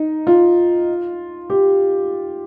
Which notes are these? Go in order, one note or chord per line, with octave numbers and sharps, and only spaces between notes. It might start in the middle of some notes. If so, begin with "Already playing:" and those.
Already playing: D#4
F4
G4